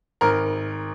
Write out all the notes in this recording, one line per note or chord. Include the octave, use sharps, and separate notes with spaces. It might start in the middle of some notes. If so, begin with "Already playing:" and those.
G#1 A#4